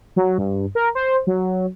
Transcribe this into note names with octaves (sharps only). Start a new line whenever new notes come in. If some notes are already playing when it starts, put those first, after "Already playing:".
F#3
G2
A#4
C5
F#3